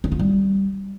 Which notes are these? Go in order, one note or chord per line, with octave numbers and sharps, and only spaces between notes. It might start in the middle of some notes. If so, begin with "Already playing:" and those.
D4
F4
G3